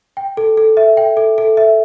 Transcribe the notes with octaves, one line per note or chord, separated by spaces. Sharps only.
G5
A4
A4
E5
G5
A4
A4
E5